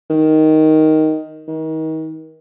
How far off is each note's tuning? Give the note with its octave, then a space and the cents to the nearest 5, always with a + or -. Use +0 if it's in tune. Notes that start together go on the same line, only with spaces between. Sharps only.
D#3 +5
D#3 +35